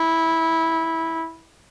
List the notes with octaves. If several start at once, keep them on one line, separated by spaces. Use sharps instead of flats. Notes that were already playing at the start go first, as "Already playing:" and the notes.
Already playing: E4